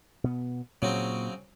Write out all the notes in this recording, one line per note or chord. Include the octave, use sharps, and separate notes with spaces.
B2 B3
A#2 C#3 F#3 C4